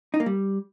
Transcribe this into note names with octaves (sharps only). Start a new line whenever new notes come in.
D#4
A#3
G3